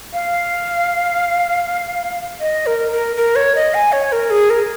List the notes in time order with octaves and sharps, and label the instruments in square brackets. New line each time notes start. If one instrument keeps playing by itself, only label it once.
[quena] F5
D#5
A#4
A#4
A#4
C#5
D#5
G#5
C#5
A#4
G#4
A#4